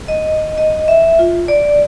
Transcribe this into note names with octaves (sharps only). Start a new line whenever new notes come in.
D#5
D#5
E5
F4
D5